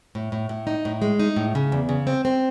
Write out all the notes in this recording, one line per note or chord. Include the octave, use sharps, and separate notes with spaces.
A2
A2
A2
D#4
A2
G#3
D#4
A2
C#3
E2
C#3
C4
C4